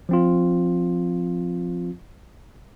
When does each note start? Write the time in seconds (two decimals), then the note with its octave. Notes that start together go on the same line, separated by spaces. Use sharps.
0.09 F3 C4 F4